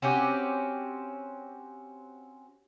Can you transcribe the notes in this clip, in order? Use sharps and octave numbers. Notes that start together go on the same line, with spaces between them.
C4 C#4 F#4 G4